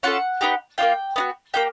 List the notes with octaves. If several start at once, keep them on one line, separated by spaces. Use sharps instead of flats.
C#4 F4 A4 F#5
B3 D#4 G4
A#3 D4 F4 G5
B3 D#4 F#4
A#3 D#4 G4 G5